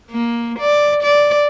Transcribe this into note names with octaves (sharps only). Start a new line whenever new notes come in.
A#3
D5
D5